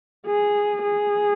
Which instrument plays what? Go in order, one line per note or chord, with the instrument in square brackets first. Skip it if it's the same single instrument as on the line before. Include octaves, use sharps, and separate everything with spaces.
[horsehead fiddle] G#4
G#4